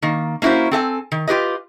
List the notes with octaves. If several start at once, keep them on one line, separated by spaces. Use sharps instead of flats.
D#3 A#3
A#3 C#4 E4 F#4 C5
C4 A4 E5 G#5
D#3
F4 G4 B4 D#5